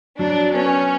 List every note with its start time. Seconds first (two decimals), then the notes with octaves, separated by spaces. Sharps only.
0.19 F#3 D4
0.54 B3 C#4